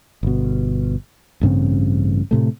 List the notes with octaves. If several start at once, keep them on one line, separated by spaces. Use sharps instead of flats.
G1 B2
A1 G2 C#3 C4
A2 C3 A3